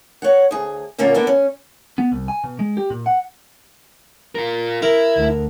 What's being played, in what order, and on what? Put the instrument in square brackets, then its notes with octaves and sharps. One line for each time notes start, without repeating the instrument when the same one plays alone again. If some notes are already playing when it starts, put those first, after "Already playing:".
[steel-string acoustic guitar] C#5 F#5
D2 G#4
A#2 D3 A#3 C#4 F4
A#3 B3 D4 A4
C#4
[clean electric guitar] B3
C2
G#5
B2
G#3
G4
A#2
F#5
[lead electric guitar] F4 A#4
[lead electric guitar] E4 [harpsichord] A#4
[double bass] D2